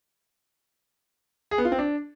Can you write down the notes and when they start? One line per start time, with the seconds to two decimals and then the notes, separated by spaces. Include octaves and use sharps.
1.51 G#4
1.58 B3
1.65 F4
1.72 C4
1.79 D4